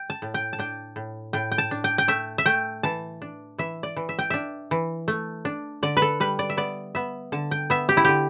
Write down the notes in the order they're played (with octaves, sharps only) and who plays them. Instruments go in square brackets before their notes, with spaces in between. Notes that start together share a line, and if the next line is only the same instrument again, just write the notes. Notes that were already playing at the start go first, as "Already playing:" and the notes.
Already playing: [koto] G5
A5
A2
G5
A5
D4 G5
A2
A2 G5
G5
A5
D4
G5
G5
A3 E5
E5
A3 G5
E3 A5
D4
E3 E5
D5
E3
E5
G5
D4 E5
E3
A3
D4
D3 D5
B4
A4
G3 B4
D5
E5
B3 D5
B3 E5
D3 A5
G5
B3 E5
G4
E4
D3 G4